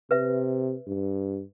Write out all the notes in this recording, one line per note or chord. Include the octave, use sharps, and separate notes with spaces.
C3 B4 E5
G2